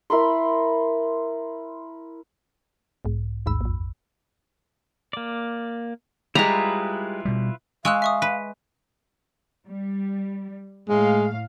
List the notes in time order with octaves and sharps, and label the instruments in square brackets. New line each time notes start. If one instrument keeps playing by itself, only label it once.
[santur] E4 A#4 B5 C6
[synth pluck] B1 G#2
A1 D#2 G#2 B5 E6
A#1 F2
[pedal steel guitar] A#3 D5
[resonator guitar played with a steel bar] G3 G#3 [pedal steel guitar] E4 F4 B4 [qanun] A#5
[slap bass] B2 G3
[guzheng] G#3 [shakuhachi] F5 [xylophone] C#6 E6 F#6
[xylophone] E5 C#6 D#6
[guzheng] B4
[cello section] G3
[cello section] A2 F5 [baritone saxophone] G#3